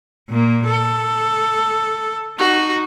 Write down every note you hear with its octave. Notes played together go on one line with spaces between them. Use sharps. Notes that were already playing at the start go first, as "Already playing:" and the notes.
A#2 A#3
A4
D#4 F#4